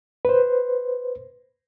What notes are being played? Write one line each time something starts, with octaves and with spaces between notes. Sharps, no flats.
B4 C5